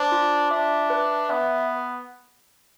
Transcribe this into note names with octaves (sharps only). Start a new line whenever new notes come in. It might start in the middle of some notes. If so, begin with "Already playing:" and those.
Already playing: D4 C5
F4
D4 E5
B4
B3 E5